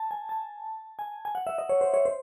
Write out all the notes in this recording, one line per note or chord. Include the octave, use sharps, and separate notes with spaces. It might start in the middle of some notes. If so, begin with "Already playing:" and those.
Already playing: A5
G#5
A5
G#5
G#5
F#5
E5
D#5
C#5
C5
C#5
C5